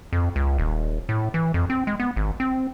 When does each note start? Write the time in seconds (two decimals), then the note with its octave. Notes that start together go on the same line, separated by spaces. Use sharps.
0.13 F2
0.36 C#2
0.58 D#1
1.09 A2
1.34 E3
1.54 F2
1.70 C4
1.87 G#3
2.00 B3
2.16 G#1
2.40 C4